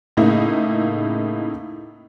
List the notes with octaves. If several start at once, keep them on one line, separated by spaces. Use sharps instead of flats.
A2 C#3 A#3 D#4 E4